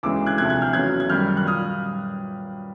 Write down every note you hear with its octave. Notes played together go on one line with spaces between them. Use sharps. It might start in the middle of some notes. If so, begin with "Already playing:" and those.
D2 C#3 E3 G#3 D6 E6
F#6 G#6
D2 C3 F3 A3 F#6 G#6
F#6 G#6
F6 G6
E2 C#3 F#3 A3 F#6 G#6
G#6
F#2 D#3 G3 F6 G6
F6
F#6
A#2 G3 D#6 F6